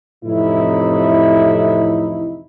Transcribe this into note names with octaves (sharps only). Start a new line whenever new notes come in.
F2 A2 C3 E3 D#4 E4